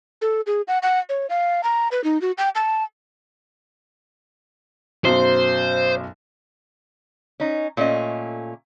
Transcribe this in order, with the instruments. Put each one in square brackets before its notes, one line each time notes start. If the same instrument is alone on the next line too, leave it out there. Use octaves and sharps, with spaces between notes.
[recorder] A4
G#4
F#5
F#5
C#5
F5
A#5
B4
D#4
F#4
G5
A5
[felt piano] B1 F#2 F#3 [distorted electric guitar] C5
[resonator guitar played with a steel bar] C#4 D#4
A#2 A3 C#4 D4 D#5